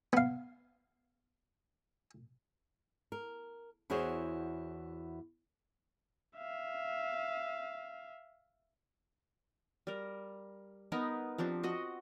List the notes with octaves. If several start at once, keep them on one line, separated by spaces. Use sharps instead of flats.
B3 F5
A#4
E2 E4 F#4 G#4 C5 C#5
E5 F5
G3 A#4
B3 D#4 A#4 B4
F3 C4 D4 G4
F#4 D#5 F#5